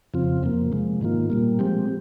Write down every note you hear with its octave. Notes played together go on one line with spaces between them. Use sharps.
F2 C#3 F3 C4 F4
F2 C3 F3 A#3
C3 F3 G#3
G#2 D#3 A#3 F4
A#2 G3 A#3
F3 G#3 C4 G4